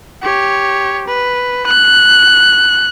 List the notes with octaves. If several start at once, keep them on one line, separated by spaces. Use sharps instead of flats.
G4 C#5
B4
F#6